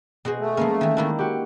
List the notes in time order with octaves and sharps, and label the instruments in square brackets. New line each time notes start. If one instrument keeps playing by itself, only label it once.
[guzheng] B2 F#4 C5 [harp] G#3 G#4
[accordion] A3
[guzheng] F3 B3 C#4 [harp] G#3 A#3
[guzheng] D#3 E3
[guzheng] D#3 A#3 D4 [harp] E4
[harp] F#4 G4